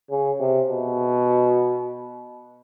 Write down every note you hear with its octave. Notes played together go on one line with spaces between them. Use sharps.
C#3
C3
B2